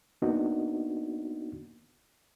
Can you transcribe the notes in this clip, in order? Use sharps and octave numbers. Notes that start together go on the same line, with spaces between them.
A#3 B3 D4 D#4 F#4